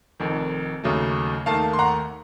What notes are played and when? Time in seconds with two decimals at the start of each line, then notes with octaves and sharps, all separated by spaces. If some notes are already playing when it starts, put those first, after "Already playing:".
0.20 F1 F2 D#3
0.84 D#2 C#3 F#3 A3
1.46 D#2 D#3 A3 F5 A5
1.73 C6
1.79 F#5 A#5